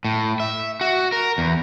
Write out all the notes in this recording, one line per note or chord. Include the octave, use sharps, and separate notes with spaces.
A2
E5
F#4
A#4
E2